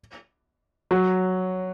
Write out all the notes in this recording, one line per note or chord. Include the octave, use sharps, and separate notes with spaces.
F#3 F#4